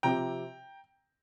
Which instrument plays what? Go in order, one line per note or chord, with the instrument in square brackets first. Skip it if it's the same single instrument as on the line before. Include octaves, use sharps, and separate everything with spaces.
[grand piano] C3 F3 C4 G4 [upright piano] G5 A#5